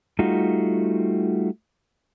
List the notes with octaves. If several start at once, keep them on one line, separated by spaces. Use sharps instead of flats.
G3 A3 D#4 F4 F#4